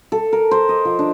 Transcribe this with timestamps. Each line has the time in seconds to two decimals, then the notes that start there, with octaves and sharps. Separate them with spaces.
0.12 A4
0.33 A#4
0.51 C5
0.69 D#5
0.85 F3
0.99 D4